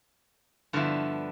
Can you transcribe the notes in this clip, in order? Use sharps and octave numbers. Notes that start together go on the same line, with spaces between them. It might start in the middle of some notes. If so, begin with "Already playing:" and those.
G2 D3 F3 B3 E4